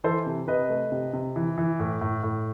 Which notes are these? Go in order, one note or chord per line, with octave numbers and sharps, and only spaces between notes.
E3 A4 C5
C3
C3 B4 D#5
A3
C3
C3
E3
E3
A2
A2
A2